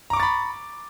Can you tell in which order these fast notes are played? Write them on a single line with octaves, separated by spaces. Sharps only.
A#5 D6 C#6 A6 B5